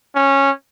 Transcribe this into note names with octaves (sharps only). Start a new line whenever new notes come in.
C#4